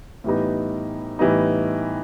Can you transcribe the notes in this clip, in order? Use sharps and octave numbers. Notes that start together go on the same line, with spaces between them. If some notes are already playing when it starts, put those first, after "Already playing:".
A2 E3 G3 B3 D#4
A2 E3 G3 B3 D#4